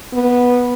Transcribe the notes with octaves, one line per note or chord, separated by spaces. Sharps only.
B3